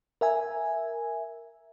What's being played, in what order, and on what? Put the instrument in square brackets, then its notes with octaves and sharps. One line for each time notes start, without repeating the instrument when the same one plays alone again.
[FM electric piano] A#4 E5 G#5